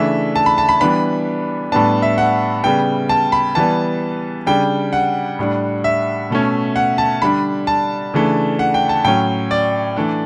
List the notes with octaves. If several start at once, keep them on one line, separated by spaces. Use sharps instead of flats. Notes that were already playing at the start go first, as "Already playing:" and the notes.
Already playing: C#3 E3 A3 D4 E5
A5
B5
A5
B5
E3 G3 B3 D4 B5
A2 G3 B3 D4 A5
E5
F#5
C#3 G3 B3 G5
A5
B5
E3 G3 B3 A5
C#3 G3 D4 G5
F#5
A2 G3 D4
E5
B2 A3 C#4
F#5
A5
D3 G3 D4 B5
A5
C#3 E3 A3 D4
F#5
G5
A5
A2 F#3 C#4 G5
D5
E3 A3 D4